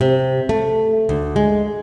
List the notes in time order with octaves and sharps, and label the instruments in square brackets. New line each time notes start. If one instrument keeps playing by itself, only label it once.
[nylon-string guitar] C3
A3
D2
G#3